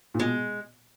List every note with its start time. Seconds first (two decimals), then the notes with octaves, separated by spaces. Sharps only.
0.14 A#2
0.19 B2 G#3